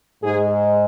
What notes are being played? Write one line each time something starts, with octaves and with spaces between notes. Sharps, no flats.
G#2 G#3 G#4